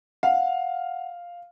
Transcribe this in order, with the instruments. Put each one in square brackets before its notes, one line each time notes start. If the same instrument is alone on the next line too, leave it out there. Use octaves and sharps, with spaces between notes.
[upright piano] F5 [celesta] F#5